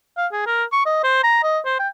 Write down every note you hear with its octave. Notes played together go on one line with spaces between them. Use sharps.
F5
G#4
A#4
C#6
D#5
C5
A#5
D#5
C5
G5